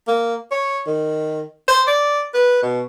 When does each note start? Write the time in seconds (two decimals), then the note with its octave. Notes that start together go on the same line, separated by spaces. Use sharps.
0.08 A#3
0.51 C#5
0.87 D#3
1.68 C5
1.88 D5
2.34 B4
2.62 B2